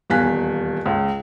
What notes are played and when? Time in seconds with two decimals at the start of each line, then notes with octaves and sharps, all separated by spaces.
0.10 D#1 E2 F5 G#5 F#6 B6
0.86 C#2